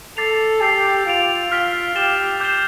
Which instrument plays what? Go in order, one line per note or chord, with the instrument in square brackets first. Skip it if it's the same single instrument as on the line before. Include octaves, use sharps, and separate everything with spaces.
[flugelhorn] A4 [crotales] D6 A6 C7 F7
[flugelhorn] G4 [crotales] E6 A6 C7 F7
[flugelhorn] F4 [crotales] G6 D7 F7
[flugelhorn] F4 [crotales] F6 B6 D7 G7
[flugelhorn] G4 [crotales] A6 E7 G7
[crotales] D6 G6 C7 E7 G7